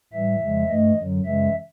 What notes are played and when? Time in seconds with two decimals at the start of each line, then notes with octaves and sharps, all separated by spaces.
0.13 A2 E3 G3 E5
0.41 F2 C#3 F3 G#3
0.69 G2 E3 A3 D#5
0.97 F#2 D3 F#3
1.25 F#2 C#3 E3 G#3 E5